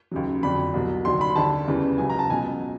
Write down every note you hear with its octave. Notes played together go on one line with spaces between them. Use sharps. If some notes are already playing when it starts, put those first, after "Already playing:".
D#2 C#3 F#3
F2 D3 F#3 B5
C2 B2 F#3
D#2 D3 F#3 C6
B5
D#2 D3 G3 A5
E2 C#3 E3 G3
C#2 C#3 F#3 G#5
A#5
A5
C#2 B2 F#3 G#5